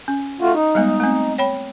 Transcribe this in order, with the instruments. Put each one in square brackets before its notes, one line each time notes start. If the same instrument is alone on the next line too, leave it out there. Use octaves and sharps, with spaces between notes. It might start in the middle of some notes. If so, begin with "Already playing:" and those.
[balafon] C#4
[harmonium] A3 F4 F#4
D#4
[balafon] G3 G#3 B3
A3 C4
C#5 G5 B5